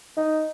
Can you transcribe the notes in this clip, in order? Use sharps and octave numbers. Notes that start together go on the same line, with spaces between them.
D#4